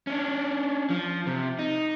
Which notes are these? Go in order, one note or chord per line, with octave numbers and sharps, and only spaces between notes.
C#4 D4
F3
C3
D#4